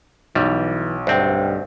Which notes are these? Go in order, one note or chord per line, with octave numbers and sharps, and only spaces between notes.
B1 E3 G3
D2 G2 C4 C5 G5